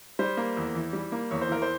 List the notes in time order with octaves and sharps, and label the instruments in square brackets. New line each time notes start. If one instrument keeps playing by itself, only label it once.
[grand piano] G3 C5
A#3
E2
E3
G3
A#3
E2 C#5
C5
E3 A#4
C5